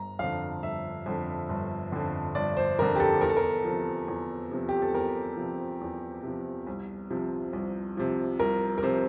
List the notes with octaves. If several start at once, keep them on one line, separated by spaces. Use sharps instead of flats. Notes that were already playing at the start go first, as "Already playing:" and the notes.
Already playing: G1 A#5
F2 D3 F5
G1 E5
F2 D3
G1
F2 D3
G1 D5
C5
F2 D3 A#4
G4
A4
E2 A#4
A4
A#4
C3 F3
E2
C3 F3
G4
A4
E2 A#4
C3 F3
E2
C3 F3
C2
C3 F3
C2
C3 F3
C2 A#4
A#4
C3 F3 C5